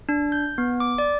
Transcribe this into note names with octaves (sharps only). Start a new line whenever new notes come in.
D4
G6
B3
D6
D5